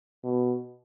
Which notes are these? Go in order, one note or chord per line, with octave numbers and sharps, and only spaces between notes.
B2